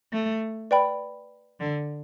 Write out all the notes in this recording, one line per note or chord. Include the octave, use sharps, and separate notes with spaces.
A3
B4 D5 G5 B5
D3